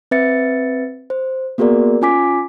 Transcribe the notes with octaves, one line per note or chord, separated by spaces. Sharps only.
C4 B4 E5 A6 C#7
C5
A#3 B3 F#4 G#4 A#4 D5
C#4 F4 G#5 D6 B6